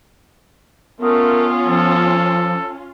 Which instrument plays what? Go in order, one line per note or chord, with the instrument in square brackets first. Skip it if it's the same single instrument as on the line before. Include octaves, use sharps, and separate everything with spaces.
[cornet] A3 [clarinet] B3 [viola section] C#4 F4 [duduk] A#4
[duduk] F3 [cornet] A4